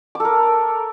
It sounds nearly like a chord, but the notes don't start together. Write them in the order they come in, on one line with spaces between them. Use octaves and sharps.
D6 A4 A#4